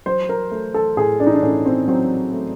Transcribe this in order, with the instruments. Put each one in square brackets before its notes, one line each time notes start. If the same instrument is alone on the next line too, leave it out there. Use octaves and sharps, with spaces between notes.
[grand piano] F#3 C5
A#4
A3
A4
A2 G#4
D4
D#4
D4
A2 C#4
C4
F#3 C4
A3